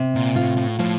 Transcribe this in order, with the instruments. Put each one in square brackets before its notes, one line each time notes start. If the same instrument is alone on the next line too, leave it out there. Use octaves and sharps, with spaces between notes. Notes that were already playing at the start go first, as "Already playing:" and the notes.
Already playing: [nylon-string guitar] C3
[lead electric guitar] A#2
[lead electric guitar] A2 [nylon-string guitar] F4
[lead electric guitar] A2
[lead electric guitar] A2 [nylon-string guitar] F3